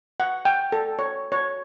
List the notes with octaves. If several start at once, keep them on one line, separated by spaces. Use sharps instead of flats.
F#5
G5
A4
C#5
C#5